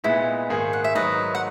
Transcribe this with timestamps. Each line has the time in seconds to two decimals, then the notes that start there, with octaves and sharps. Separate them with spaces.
0.04 A#2 G#3 B3 D#4 E4
0.49 G#2 D#3 A#3 D#4 G#4
0.73 F#5
0.84 E5
0.95 G#2 D#3 F#3 B4 D#5
1.35 F#5